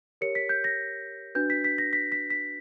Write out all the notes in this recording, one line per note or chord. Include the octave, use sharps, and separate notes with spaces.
G4 A#4 C#5 C#7
B6
G6
A#6
D4 F#4 B4 G6
B6
B6
A#6
B6
B6
B6